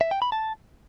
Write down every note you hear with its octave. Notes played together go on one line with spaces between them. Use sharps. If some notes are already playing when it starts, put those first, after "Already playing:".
E5
G5
B5
A5